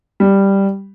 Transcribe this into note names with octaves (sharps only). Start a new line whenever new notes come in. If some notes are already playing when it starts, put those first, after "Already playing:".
G3